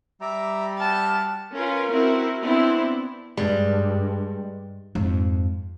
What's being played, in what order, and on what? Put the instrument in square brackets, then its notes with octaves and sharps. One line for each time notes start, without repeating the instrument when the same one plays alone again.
[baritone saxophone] G3 [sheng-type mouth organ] E5 A#5 D6
[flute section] F#4 E5 F6 [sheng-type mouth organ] G5 [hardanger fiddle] A5
[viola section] C#4 F4 A#4 B4
C4 E4 F#4 A#4
B3 C4 D4 E4
[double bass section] G2 [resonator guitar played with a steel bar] G3 [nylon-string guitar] G#3
[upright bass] F2 G#2